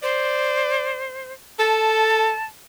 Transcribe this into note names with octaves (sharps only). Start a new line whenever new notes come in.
C5 D5
A4 A5